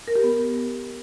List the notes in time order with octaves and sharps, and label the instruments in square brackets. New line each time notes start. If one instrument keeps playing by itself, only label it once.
[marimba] A#4
G4
B3